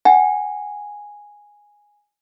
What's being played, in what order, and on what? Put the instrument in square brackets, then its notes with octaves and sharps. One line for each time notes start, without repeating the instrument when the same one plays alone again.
[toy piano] F#5 [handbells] G#5